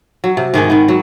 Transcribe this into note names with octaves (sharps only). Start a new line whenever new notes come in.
F#3
C3
G#2 D#3 D#4 G#4
D#3 B3
F#3